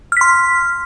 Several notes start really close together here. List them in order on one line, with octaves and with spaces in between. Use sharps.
F6 B6 C6